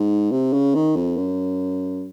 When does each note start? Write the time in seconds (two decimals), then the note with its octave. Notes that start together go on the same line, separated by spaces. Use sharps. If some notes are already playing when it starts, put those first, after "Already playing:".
Already playing: G#2
0.32 C3
0.53 C#3
0.75 D#3
0.96 F2
1.17 F#2